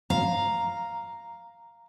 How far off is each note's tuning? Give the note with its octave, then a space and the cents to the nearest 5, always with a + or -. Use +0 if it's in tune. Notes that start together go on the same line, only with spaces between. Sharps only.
F5 +0 A#5 +0